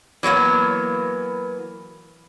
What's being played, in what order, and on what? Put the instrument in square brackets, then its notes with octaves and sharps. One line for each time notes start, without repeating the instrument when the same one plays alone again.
[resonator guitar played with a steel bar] E3 F#3 A#3 B3